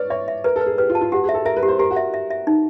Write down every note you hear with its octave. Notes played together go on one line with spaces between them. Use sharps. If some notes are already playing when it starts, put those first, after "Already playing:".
Already playing: B4 C#5 D5
C#5 E5
E5
A#4 B4
A4
B4
G#4
G4 B4
F4
A5
F4
F#4 G4
G#4
E5
A4
A#4 E5
B4
G4
C5
G4 A#4
F#4
E5
E5
E5
D#4